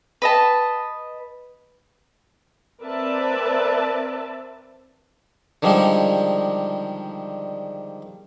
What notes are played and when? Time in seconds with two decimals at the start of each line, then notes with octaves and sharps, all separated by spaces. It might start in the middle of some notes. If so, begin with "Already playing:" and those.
0.22 B4 D#5 A5
2.81 C4 A#4 B4 D5 E5 A5
5.62 D3 D#3 F3 G3 G#3